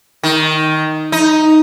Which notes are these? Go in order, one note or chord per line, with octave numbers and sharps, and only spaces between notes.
D#3
D#4